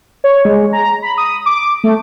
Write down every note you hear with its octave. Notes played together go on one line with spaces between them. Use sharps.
C#5
G#3
A#5
B5
D#6
D6
A3